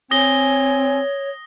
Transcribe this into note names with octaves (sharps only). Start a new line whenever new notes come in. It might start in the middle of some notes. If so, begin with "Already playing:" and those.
C4 C#5 G#5 D#6 A#6 G7